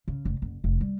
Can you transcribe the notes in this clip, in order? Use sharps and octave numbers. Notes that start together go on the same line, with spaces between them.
C#3
F1
F#1
F1
G3